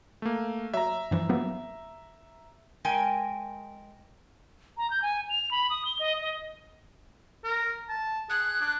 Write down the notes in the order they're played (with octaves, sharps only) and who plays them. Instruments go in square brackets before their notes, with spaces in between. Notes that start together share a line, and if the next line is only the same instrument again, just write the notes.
[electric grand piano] A3 A#3
[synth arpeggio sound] F#3 [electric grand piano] E5 A#5
[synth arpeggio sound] G2 E3 F3
F#3 A#3 B3
[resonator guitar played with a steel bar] G#3 A#4 G5 G#5
[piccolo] A#5
G6
G#5
F7
B5
D#6
G7
D#5
D#5
[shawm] A#4
A5
[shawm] G#4 [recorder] F#6
[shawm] D4